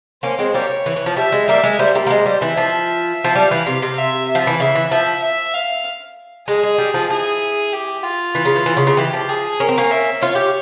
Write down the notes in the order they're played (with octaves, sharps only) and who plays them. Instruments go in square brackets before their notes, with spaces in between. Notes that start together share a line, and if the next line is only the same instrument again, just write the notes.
[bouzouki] A#3 C#4 [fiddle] C5
[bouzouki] G#3 C4
[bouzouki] G3 A#3 [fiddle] C#5
[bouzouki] E3
E3
F3
[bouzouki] G3 [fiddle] E5
[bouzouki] G#3
[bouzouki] G3 A#3 [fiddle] E5
[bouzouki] G#3
[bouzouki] G3 A#3 [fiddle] C5
[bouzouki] G3 A#3
A#3
G#3
G3
[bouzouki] E3 [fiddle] E5
[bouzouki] F3
F3
[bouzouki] G3 [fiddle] F5
[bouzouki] E3
C3
C3
[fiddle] E5
E5
[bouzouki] F3
E3
[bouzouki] C#3 [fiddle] E5
[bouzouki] E3
[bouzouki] F3 [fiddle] E5
[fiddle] E5
F5
[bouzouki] G#3 [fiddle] G#4
[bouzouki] G#3
G3
F3
[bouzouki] E3 [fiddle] G#4
[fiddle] G4
F4
[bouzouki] E3
C#3
E3
E3
C#3
C#3
[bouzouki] E3 [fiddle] G4
[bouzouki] F3
[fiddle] G#4
[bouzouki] C#4 [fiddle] A#4
[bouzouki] C4
A#3 C#4
[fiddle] E5
[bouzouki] F4 [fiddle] C#5
[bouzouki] G4